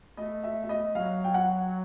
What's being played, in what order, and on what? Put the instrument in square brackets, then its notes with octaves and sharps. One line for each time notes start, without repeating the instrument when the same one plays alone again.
[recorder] A3 [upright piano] D#5
[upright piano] E5
E5
D#5
[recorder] F#3 [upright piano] F5
[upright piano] G5
F#5